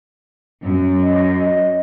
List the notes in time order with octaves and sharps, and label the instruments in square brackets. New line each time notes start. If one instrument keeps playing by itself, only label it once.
[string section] F#2
[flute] D#5